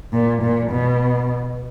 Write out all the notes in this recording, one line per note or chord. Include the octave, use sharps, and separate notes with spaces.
A#2
A#2
B2